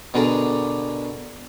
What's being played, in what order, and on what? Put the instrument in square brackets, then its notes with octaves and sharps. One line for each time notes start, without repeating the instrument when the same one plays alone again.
[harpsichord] B2 D3 D4 G#4 A#4